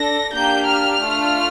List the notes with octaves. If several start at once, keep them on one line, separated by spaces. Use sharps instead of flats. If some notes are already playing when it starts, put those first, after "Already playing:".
Already playing: D4 A4 A#6
A#3 D4 G4 G6
F6
A3 D4 F4